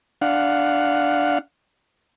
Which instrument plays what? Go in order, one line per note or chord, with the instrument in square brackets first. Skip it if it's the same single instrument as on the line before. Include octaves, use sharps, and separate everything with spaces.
[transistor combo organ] D4 F5 F#5